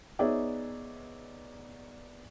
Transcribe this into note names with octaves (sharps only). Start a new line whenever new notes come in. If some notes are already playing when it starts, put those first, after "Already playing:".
B3 D#4 G#4 C#5 D5 E5